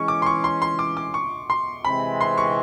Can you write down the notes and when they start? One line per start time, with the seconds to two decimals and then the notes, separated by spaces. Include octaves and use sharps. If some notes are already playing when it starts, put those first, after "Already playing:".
Already playing: E3 G#3 C#4 C#6
0.08 D6
0.22 C6
0.26 C#6
0.44 C6
0.62 C6
0.79 D6
0.97 D6
1.14 C#6
1.50 C6
1.85 C3 E3 G#3 C4 B5
2.21 C6
2.38 C#6